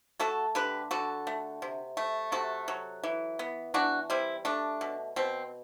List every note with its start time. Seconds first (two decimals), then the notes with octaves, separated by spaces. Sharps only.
0.20 A3 F#4 A4
0.55 D3 G4 B4
0.91 D3 F#4 A4
1.27 A3
1.62 C3
1.97 A3
2.32 C3 F#4 A4
2.68 F#3
3.04 E3
3.39 B3
3.74 E3 D4 F#4
4.10 G3 C4 E4
4.45 A3 D4
4.81 B2
5.16 B2 C4